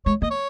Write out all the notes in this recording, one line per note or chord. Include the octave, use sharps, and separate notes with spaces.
G#3 C#5
A#3 D#5
C#5